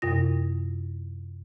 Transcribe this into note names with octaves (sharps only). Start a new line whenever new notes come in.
F#2 C3 F4 A#6